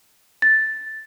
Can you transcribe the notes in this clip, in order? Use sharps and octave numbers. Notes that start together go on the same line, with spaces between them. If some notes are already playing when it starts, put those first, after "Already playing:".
A6